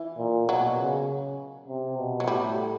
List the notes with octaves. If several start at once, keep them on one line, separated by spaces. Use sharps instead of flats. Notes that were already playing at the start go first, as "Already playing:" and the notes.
Already playing: E3
A#2
B2 F#3
C#3
C3
B2
F#3
A2 G3